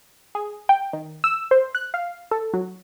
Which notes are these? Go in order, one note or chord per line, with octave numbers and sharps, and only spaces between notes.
G#4
G5
D#3
E6
C5
F#6
F5
A4
F#3